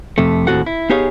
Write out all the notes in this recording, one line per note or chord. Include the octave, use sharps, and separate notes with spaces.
F2 C3 A3
D#2 A2 C4 F#4 A4 F#5
E4
B3 D#4 G4 G#4 C#5 F5